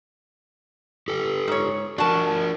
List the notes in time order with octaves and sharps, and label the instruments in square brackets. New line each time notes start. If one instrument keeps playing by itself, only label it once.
[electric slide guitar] G4 A4
[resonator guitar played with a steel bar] G#2 C#5
[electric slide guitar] D4 A#4 [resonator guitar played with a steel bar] F#4 A5